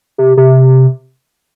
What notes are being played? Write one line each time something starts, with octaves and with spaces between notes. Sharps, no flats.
C3
C3